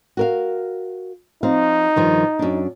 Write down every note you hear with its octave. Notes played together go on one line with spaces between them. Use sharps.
F#4 A#4 F5
F3 C4 D#4 F5
G2 D#3 F3
F#2 D4